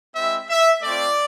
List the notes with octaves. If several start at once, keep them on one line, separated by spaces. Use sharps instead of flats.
G#3 C4 E4 E5
E5
A3 C4 F4 D5